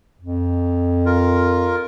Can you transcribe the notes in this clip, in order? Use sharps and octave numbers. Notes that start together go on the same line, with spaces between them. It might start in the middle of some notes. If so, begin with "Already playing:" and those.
F2
F4 A#4